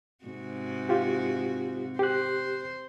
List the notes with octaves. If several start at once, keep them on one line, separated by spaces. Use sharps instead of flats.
G#2 C3 F#4
F4 G4
G4 C5 F#6